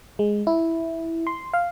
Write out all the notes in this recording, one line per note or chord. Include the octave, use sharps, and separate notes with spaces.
G#3
E4
C6
F5